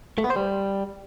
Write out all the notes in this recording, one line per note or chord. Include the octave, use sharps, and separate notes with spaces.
A3
B3
C5
G3